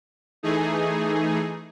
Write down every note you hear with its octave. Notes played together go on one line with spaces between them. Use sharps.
E3 A3 D#4 G#4